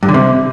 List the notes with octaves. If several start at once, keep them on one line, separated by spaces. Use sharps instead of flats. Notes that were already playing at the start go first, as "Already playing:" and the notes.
G2
D3
C3